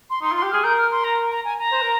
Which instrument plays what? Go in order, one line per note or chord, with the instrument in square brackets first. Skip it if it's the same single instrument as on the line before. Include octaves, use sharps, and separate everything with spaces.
[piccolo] C6
[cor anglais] D#4 [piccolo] C6
[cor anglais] F4 [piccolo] C6
[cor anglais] G4
[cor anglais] G#4 [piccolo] F6
[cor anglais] A#4 [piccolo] G6
[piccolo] F6
C6
A#5
A#5
G#5
A#5
[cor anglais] C5
A#4